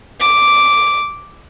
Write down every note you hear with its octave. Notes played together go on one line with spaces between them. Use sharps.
D6